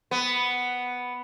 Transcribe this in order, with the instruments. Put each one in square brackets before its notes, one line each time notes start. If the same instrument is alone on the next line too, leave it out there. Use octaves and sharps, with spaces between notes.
[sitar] B3